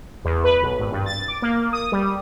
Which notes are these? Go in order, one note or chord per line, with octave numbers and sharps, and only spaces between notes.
E2
B4
B1
G#1
G2
A6
D6
A#3
D#6
G3